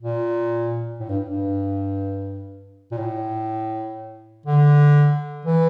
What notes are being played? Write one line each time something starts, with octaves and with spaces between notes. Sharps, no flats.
A#2
A2
G2
G2
A#2
A2
D3
E3